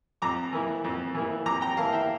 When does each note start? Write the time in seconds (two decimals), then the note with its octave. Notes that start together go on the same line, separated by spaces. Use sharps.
0.22 F2 A#5 D6
0.53 E3 A#3 E4
0.84 F2
1.14 E3 A#3 E4
1.46 F2 A#5 D6
1.61 G5 A#5
1.77 E3 A#3 E4 F5 A5
1.92 E5 G5